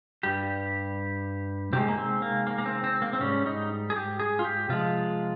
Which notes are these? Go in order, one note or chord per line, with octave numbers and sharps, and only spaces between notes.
G2 G3 G4
C3 D#3 G#3 G4
A#3
C4
A#3
A#3
A#3
C4
C4
A#3
C4
G#2 G3 C#4
D#4
G#4
G4
G#4
F4
G4
C3 F3 G#3 F4